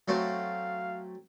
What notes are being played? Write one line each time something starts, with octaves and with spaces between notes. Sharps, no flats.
F#3 A3 C4 F5